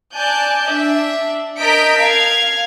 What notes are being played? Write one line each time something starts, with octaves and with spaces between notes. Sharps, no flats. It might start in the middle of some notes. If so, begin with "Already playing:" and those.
D5 G#5 A5 F#6 G6
D4 E5
A#4 D#5 A5 G6 B6 D7
F5 G#6